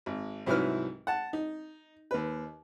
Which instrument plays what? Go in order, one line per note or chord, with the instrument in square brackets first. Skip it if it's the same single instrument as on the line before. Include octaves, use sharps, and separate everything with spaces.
[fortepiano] G#1
C2 G#2 F#3 E4 B4 F6
F#5 A5
D#4
D#2 B4